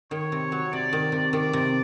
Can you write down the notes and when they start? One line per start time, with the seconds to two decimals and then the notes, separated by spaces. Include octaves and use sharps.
0.11 D#3 C#5
0.32 C3
0.52 F#3
0.73 C3 D5
0.93 D#3
1.12 C3
1.33 D#3 D5
1.53 C3